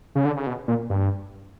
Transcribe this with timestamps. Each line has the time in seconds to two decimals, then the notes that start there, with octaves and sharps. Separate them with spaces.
0.15 C#3
0.25 D3
0.37 C#3
0.47 B2
0.68 A#2
0.90 G2